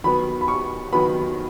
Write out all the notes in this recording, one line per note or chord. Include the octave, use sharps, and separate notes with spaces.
D#3 F#3 B3 B5
B5
C#6
D#3 F#3 B3 B5